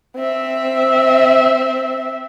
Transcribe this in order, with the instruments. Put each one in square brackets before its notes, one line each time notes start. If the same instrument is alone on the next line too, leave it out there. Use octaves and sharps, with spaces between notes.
[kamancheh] C4 E5